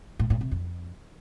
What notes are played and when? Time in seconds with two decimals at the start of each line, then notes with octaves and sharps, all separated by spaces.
0.19 A2
0.30 A2
0.41 C3
0.51 F2